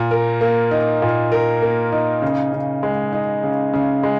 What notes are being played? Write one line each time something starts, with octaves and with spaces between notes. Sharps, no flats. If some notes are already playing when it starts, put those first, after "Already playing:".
Already playing: A#2
A#4
A#3
D#4
A#2
A#4
A#3
D#4
C#3
C#3
G#3
D#4
C#3
C#3
G#3